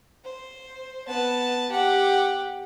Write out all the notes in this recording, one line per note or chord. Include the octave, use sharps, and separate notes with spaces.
C5
B3 A5
G4 F#5